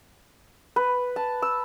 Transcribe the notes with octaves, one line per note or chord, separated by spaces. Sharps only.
B4
A5
E6